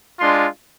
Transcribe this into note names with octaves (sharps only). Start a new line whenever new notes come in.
G#3 D4 F4 C6